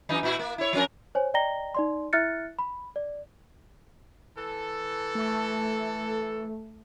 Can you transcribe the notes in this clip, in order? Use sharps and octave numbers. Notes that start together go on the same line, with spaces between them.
F#2 E3 D#4
A#2 E4 F#4
A#3
E4 C#5
F3 C#4 A#4
C5 C#5 G#5
D5 D#5 G5 A#5 A#6 G7
D#4 D5 C6
E4 E5 F6 F#6 A6 C#7
B5
D5
E3 A4
A3